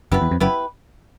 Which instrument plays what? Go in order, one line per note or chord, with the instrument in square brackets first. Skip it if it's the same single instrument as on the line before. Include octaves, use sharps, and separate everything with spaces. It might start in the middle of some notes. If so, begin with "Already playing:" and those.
[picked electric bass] F#1 F#2 [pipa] B3 E4 G4 B4
[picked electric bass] E2
F2
[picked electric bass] F#1 F#2 [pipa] B3 E4 G4 B4